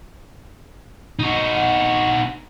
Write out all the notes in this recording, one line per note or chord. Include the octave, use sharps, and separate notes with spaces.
D#4 F#4